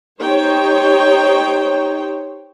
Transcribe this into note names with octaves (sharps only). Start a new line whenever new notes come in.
D#4 G4 C5 C#5 G5